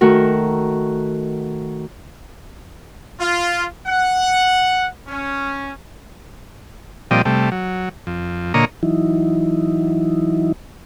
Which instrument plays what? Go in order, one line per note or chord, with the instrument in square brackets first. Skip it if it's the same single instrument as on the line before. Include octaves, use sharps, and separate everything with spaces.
[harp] D#3 A3 F#4 A#4
[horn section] F4
F#5
C#4
[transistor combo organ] A#2 F3 G3 C4 D5 D#5
C3 G3 A3
F#3
F2
A#2 D3 A#3 C#5 D#5 A#5
[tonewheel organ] E3 F#3 D#4 E4